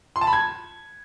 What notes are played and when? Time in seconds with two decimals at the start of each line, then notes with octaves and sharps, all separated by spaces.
0.16 C6
0.21 A5
0.27 B5
0.33 G#6